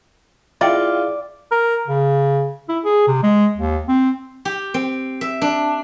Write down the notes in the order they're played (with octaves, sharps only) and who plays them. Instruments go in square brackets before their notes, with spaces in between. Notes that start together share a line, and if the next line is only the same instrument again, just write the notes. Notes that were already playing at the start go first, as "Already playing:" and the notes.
[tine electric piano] E4 G#4 F5 [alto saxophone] F4 [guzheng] D5 [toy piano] E5 G5
[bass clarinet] A#4
C#3
E4
G#4
C3
G#3
D#2
C4
[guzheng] G4
C4
E5
D4